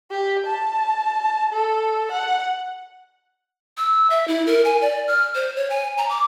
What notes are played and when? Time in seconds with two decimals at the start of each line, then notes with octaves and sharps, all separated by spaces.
0.11 G4
0.46 A5
1.53 A4
2.12 F#5
3.77 E6
4.10 E5
4.28 E4
4.47 A#4
4.65 G#5
4.81 D5
5.07 F6
5.35 C5
5.56 C#5
5.70 G#5
5.98 A#5
6.09 D6